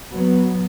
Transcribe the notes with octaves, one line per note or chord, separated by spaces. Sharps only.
F#3 B3